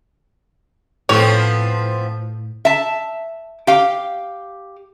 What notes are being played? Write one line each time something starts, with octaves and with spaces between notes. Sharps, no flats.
A2 F3 B3 C4 C#5
E5 A5
G4 F5